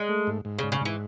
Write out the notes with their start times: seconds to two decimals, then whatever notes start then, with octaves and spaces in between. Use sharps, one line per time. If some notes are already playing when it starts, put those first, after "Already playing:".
Already playing: G#3
0.09 A3
0.27 G#2
0.45 G#2
0.59 G#2 C#3
0.72 C#3
0.81 G#2 E3